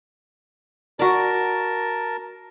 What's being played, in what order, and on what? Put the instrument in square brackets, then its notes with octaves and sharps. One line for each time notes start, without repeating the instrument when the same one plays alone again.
[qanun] F#4 D5 [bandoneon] A#4 A5